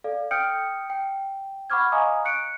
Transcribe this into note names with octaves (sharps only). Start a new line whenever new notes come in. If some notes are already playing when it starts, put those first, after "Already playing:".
A4 D5 F5
G5 D#6 F6 G6 C#7 D7
G5
F#5 B5 C#6 D6 F6 G#6
D#5 F5 G#5 A#5 C#6 D#6
F#6 C#7 D7